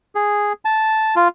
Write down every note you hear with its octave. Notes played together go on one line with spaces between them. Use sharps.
G#4
A5
F4